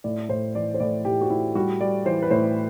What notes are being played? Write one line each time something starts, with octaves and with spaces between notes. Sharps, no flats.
A2 D5
A2 C5
E3 D5
C5
A2 D5
A2 G4
F#4
A2 E4
G3 F#4
G3 D5
E3 C5
B4
A2 C5